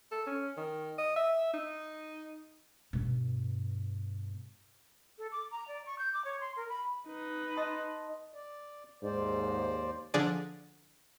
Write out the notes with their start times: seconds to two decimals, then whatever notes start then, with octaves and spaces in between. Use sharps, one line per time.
0.12 A4
0.27 C#4
0.57 D#3
0.98 D#5
1.16 E5
1.54 D#4
2.93 G2 B2
5.18 A4
5.32 D6
5.51 A#5
5.68 D5
5.86 C#6
5.99 G6
6.14 D6
6.25 C#5
6.41 C6
6.56 A#4
6.69 B5
7.08 D#4 B4
7.57 D#5 A5 C6
8.34 D5
9.03 D#2 G#2 C5 D5
10.14 D3 F3 D4 G#4 D5